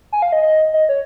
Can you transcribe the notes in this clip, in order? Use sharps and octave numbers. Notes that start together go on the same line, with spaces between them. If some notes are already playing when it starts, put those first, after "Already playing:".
G#5
F5
D#5
D#5
D#5
C#5